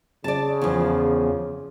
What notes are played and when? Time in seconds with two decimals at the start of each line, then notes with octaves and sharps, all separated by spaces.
0.24 C#3 D5 A5
0.61 E2 F3